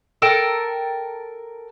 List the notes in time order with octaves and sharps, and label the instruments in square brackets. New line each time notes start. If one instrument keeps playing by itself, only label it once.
[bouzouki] A4 A#4 G5 A#5